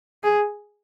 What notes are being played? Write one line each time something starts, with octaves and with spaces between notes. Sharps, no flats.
G#4